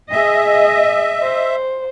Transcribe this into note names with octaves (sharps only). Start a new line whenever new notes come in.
G#4 D#5 E5
C5